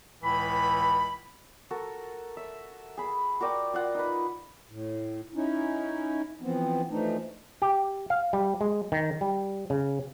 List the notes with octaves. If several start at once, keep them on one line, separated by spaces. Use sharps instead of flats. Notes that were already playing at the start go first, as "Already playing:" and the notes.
C#2 A2 E3 B5
F#4 A4 A#4
E5
G#4 B5
F#4 A#4 D5 G5
F4 D5 F#5
D#4 B4
A2
C#4 D#4 E4
E3 F3 B3 C4
E3 F3 A3 D4 D#4
G4
F5
G3
G#3
D#3
G3
C#3